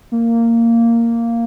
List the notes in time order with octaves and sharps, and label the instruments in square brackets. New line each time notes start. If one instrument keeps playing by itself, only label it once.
[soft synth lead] A#3